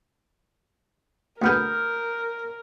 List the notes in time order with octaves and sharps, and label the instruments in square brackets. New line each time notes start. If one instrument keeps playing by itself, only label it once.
[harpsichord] D2 B3 G#4 [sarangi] A#4 [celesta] D#6 F6 G6